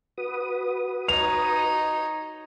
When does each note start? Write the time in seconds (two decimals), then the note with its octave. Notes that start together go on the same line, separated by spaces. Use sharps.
0.18 F#4 B4 D#6
1.08 D#4 C#5 F7